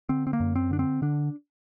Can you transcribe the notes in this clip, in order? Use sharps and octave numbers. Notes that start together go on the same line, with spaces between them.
D3 C4
C4
A#3
F#2
C4
D3 D4
C4
D3 D4